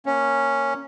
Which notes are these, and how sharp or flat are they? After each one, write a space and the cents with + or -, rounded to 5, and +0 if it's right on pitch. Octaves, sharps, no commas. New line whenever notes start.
A#3 +0 C#4 +0